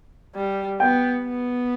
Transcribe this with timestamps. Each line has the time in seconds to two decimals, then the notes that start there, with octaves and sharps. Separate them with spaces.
0.35 G3
0.79 B3 G5
1.24 B3